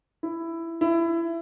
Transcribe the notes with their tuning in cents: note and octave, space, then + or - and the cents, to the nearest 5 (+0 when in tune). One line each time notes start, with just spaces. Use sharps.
E4 +10
E4 +20